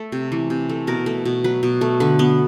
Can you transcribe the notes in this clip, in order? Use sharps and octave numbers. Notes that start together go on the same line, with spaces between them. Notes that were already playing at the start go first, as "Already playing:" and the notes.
Already playing: A3 A4
C3
E3
C3
A3
B2 A#4
A3
B2
F#3 B4
B2
A3
D3 B4
B3